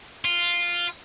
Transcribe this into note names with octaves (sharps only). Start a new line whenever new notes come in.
F4